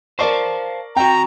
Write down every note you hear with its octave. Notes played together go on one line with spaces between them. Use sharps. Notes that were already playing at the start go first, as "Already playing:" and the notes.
A#4 C5 D5 F5 A5 C#6
C4 F#4 G5 A#5